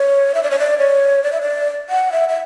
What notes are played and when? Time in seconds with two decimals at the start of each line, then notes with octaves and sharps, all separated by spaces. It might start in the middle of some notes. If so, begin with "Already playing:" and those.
Already playing: C#5
0.35 E5
0.43 D5
0.51 C#5
0.59 D5
0.78 C#5
1.23 D5
1.32 E5
1.41 D5
1.90 F#5
2.12 E5
2.29 E5